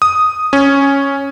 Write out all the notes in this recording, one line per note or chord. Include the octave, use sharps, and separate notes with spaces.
D#6
C#4